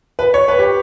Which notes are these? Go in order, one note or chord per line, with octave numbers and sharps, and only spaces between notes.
B4
C#5
B4
G4